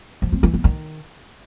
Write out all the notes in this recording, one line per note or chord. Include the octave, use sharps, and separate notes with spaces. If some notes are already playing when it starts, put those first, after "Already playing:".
F3
C4
E3
B3
D#3